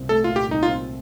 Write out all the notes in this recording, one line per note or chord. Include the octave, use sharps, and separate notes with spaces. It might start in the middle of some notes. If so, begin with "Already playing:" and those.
Already playing: C2 A#2 C4
A3 A4
A#2 F4
G4
C2 D#4
F4
C4